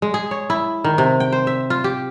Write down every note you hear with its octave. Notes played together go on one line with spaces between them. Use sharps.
G#3
G#4
C#5
E4
D#3
C3
G5
C5
E5
F4
G4